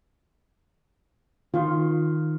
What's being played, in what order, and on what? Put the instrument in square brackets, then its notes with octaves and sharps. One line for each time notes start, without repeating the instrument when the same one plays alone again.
[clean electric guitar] D#3 [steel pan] F4